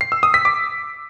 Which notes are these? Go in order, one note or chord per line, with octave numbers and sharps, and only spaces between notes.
C7
E6
D#6
B6
D6